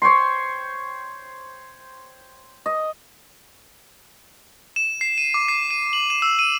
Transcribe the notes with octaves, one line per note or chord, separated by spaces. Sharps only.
C5 C#5 G5 C6
D#5
E7
C7
D#7
D6
C7
D#7
F#7
E7
E6
D#7